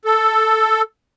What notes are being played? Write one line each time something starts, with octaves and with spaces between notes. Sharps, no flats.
A4